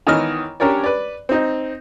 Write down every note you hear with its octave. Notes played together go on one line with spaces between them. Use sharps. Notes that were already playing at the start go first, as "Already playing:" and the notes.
D#3 E3 B3 C#5 D#5 F6
C#4 D4 G4 A#4 C#5 D5
B4 D5
C4 D#4